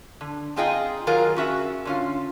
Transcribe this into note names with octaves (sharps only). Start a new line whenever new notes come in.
D3
C4 D#4 F4 G#4 D#5 G5
D#3 F#3 F4 G#4 A#4
C#4 F#4 E5
D3 C#4 F4